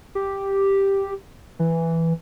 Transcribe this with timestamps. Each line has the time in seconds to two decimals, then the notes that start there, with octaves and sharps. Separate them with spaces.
0.15 G4
1.59 E3